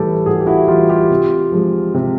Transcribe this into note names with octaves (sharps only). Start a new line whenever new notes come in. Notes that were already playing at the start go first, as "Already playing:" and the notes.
Already playing: A2 E3 G3 G4 A4
A2 F#4 G#4
G4
E4 F#4
E3 G3 F4 G4
F4 G4
C3
F3 G#3
C3